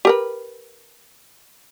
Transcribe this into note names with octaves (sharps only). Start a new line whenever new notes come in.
G4 A#4 B4